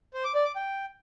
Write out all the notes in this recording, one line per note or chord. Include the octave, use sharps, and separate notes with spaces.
C5
D6
D5
D6
G5